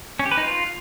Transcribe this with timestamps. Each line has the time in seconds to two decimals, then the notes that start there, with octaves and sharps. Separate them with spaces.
0.19 C#4
0.25 G4
0.31 B4
0.37 D#4
0.43 F4